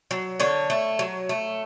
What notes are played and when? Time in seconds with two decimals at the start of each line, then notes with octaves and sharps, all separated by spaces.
0.11 F#3
0.40 D3 C#5
0.70 A3
0.99 F#3
1.29 A3